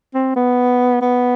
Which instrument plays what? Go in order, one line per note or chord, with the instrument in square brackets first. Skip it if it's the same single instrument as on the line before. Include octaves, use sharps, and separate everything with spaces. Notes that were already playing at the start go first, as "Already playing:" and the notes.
[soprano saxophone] C4
B3
B3